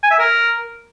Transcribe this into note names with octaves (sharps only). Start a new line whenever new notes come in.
G#5
E5
A#4